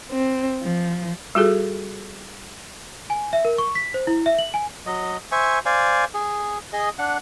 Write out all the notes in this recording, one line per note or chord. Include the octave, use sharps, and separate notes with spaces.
C4
F3
G3 F4 F#4 G#4 A4
G#5
E5
A#4
C#6
B6
C5
E4
E5
F#7
G#5
F#3 D#5
C5 E5 G#5 C#6
C5 D5 F5 G#5
G#4
G#4 D#5
D4 F#5